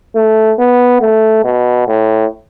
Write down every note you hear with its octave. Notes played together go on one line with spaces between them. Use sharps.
A3
B3
A3
B2
A2